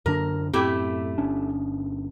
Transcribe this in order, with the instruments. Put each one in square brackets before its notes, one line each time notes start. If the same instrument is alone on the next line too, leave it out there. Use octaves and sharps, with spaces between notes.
[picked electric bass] F#2 D3 D4 [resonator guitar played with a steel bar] A#4
[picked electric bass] F#2 A2 C4 [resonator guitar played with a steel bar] A3 E4 G4
[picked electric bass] G1 C#4 D4